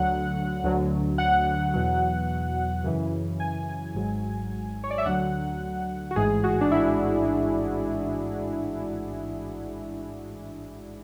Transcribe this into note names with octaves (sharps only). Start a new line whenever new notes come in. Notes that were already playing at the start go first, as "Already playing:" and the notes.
Already playing: D2 D3 F#3 F#5
D2 D3 F#3
F#5
E2 B2 F#3
F#2 C#3 E3
G#5
G#1 G#2 F#3
C#5
D5
E5
D2 D3 F#3 F#5
F#4
A1 G#2 E3 G#4
F#4
D4
E4